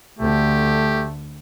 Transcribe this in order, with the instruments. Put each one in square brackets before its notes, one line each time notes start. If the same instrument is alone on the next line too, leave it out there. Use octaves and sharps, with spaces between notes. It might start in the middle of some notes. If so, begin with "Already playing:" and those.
[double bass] D2 D3 [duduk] A3 [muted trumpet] G4